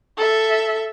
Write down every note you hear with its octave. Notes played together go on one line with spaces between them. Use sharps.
A4 E5